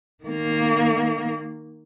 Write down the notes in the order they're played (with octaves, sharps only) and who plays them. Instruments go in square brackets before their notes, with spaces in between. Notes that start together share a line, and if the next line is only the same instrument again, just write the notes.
[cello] D#3 A#3